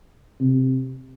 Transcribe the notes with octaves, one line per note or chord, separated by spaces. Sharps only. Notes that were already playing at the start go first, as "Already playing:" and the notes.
C3